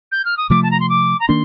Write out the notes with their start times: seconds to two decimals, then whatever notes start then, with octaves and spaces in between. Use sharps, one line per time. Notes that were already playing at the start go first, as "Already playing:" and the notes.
0.12 G6
0.25 F6
0.37 D#6
0.50 C3 F3 A3 D6
0.63 A5
0.71 A#5
0.80 C6
0.89 D6
1.20 A#5
1.28 D#3 A#3 D4 C6